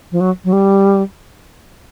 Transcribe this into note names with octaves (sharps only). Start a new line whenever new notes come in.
F3
F#3
F#3
G3